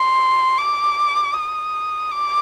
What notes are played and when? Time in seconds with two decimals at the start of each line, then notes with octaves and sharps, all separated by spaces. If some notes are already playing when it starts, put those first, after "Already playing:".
Already playing: C6
0.57 D6
1.33 D#6
2.11 D6